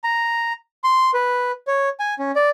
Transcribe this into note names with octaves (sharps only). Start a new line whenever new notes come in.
A#5
C6
B4
C#5
G#5
C#4
D5